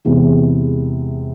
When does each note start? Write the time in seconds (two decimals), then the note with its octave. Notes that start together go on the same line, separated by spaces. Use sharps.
0.05 E2 C3 E3 G#3